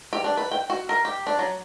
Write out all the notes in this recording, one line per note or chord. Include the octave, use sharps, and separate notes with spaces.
G4
D4
B4
G5
F#4
A#4
G4
D4
F#3